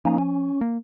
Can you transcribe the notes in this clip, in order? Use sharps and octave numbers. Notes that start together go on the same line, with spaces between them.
F3 A#3 C#4 D#4
C#4
A#3